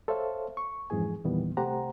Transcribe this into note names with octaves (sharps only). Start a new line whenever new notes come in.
A4 C5 C#5 E5 F5
C#6
F2 G#2 E3 G#4 G#5
E2 A#2 D#3 E3 G3 B3
C3 A3 G4 C5 F#5 A#5